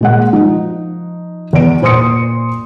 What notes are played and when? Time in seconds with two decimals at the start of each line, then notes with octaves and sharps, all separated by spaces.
0.01 A#2 G#3 F#5
0.33 F3 D#4
1.53 E2 D5 D7
1.82 A#2 C5 C6 D#6 C#7